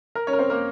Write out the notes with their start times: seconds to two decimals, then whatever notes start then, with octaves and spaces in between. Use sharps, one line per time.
0.15 A#4 A#5
0.27 C#4 C#5
0.33 A#4
0.38 C4 C5
0.50 A#3 A#4